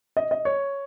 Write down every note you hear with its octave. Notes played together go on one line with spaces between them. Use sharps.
D#5
D#5
C#5